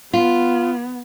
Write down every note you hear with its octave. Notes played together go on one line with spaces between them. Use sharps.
B3 F4